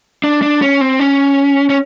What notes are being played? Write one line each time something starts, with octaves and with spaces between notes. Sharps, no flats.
D4
D4
C#4
C4
C#4
C#4